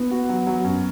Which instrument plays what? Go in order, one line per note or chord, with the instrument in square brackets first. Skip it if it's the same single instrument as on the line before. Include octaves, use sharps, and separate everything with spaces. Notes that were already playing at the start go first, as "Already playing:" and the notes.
Already playing: [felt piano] B3
[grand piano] F#4
F#3
F#3
F#2